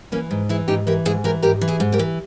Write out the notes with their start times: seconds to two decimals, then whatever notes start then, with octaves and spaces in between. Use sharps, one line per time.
0.12 E3 A#3 C#4
0.31 G#2
0.49 E3 E4 G#4
0.68 G#2 D#4 G4
0.87 E3 G4 A#4
1.05 G#2 E4 G#4
1.24 E3 G4 A#4
1.43 G#2 G4 A#4
1.61 E3
1.68 E4 G#4
1.80 G#2
1.92 G4 A#4
1.99 E3